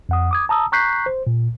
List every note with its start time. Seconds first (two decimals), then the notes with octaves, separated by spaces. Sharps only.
0.09 F2 F#5 D#6
0.31 D6 D#6 G#6
0.49 A5 A#5 D#6 E6
0.72 A#5 C#6 F#6 G6 B6 C7
1.06 C5
1.27 A#2